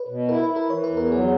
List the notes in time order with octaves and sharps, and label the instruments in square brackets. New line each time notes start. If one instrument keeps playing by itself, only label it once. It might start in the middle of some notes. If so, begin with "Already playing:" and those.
Already playing: [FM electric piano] B4 C#5
[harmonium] B2
[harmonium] E4 [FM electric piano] A#4
[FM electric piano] B4
[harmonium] E4
[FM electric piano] A#4
[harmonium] E3 [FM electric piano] C#5
[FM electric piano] B4
[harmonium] E2
[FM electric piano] A#4
[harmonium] F#3 [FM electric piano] G#4